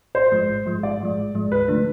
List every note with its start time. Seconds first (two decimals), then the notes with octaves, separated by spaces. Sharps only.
0.15 A1 C5
0.32 G#2 F3 G#3
0.49 A1
0.66 G#2 F3 G#3
0.83 A1 D5
1.00 G#2 F3 G#3
1.18 A1
1.35 G#2 F3 G#3
1.52 D2 B4
1.68 D3 F3 A3 D4